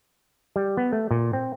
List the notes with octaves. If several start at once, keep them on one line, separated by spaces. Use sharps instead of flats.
G3
B3
A3
A#2
C4